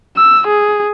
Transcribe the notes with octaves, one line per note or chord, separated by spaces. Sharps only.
E6
G#4